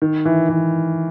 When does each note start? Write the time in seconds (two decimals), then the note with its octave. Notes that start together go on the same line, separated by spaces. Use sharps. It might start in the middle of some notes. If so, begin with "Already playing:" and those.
0.02 D#3
0.25 E3
0.49 E3